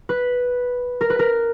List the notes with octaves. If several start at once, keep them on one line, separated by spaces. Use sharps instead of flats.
B4
A#4
B4
A#4